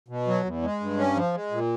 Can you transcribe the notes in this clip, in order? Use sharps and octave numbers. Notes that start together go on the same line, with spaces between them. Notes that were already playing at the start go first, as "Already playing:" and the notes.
B2
F#3
E2
G#3
G2
C#4
F3
G#3
A#2